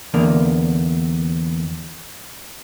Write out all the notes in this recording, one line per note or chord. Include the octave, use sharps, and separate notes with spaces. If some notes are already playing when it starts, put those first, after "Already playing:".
E2 D3 A#3